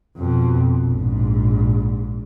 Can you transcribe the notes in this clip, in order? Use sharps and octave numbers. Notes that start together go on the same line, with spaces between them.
F2 B2
A#1 G#2